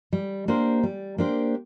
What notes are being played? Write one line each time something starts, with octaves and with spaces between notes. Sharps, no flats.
G3
A#3 D4 G4 C5
G3
A#3 D4 G4 C5